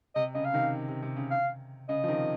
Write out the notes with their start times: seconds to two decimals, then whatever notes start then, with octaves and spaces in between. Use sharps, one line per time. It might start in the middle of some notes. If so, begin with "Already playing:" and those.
0.15 C3 D#5
0.34 C#3 D#5
0.45 F5
0.54 C3 D#3
0.89 C3
1.02 C3
1.16 C#3
1.31 F5
1.89 C#3 D#5
2.04 F3
2.08 C3 D#3